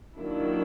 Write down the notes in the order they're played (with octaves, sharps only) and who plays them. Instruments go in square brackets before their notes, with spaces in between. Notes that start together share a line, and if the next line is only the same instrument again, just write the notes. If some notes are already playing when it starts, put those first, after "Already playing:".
[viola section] D#3 F#3 A#3 D4 E4